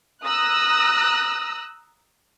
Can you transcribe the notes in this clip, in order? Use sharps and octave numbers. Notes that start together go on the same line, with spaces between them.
A#5 D#6 E6 F#6 A#6